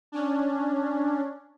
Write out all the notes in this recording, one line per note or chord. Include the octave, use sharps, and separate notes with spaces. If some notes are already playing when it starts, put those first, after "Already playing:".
C#4 D4